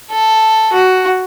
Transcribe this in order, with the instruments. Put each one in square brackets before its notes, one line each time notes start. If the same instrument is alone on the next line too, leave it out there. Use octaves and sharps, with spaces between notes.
[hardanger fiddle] A4
F#4